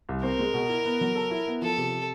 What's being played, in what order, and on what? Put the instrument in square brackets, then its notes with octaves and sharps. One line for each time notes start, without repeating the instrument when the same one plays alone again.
[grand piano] C2
[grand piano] C4 [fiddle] A#4
[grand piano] G#3
B2
E4
B3
F#3
A4
E4
B3
[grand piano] F3 [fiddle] A4
[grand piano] C3